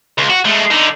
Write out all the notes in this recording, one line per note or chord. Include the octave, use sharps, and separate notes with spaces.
C#2
F#4
G#3 A3
D3 D#4